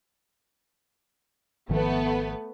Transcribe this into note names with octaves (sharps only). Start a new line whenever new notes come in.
G#1 D#3 F3 A3 B3 B4